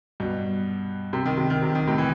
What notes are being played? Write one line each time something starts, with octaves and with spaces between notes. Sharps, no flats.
G2 B2
C3
D#3
C3
D#3
C3
D#3
A2 C3
E3